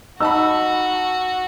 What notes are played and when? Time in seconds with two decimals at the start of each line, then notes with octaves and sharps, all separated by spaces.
0.20 D#4 F#4 A5 B5 E6